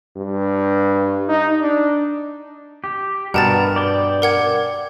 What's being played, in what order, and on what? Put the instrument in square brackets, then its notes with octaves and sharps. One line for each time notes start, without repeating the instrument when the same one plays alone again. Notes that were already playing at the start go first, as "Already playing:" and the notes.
[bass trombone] G2
D#4
D4
[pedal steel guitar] G4
[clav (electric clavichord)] G2 B2 [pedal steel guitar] A#4 [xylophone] F#5 A5 A6
[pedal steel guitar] D5 G5
[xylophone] A#4 F#5 G#6